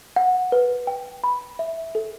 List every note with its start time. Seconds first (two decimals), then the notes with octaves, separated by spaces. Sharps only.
0.16 F#5
0.52 B4
0.87 G5
1.24 B5
1.59 E5
1.95 A4